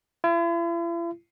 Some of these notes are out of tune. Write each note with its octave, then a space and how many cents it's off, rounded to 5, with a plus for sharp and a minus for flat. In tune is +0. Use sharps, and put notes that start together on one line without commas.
E4 +45